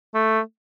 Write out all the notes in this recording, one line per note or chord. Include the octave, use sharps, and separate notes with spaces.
A3